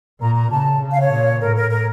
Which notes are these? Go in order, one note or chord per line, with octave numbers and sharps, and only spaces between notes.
A#2 A#5
A#5
C#3 A5
C#3
F5
C#5
A#2
A2 A#4
A#4
A#4